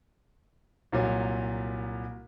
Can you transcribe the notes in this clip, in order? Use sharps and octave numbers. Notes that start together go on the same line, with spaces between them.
C2 A#2 F#3